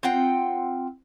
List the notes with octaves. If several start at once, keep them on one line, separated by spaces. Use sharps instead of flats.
C4 F4 F#5 G5